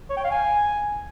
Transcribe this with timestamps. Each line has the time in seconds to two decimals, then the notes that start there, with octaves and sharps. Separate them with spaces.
0.10 C#5
0.17 G5
0.24 F5
0.31 G#5